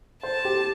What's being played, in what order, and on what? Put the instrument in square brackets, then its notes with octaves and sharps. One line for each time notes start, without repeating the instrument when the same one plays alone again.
[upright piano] C5 [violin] A5
[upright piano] G4